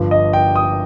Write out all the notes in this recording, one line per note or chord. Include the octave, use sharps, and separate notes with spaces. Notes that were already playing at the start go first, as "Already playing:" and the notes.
Already playing: G1 G2 F3
D#5
G5
D#6